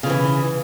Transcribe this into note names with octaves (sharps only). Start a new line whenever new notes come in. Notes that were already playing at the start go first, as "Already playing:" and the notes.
C#3 E3 F3